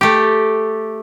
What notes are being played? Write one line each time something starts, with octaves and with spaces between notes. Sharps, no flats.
A3 G4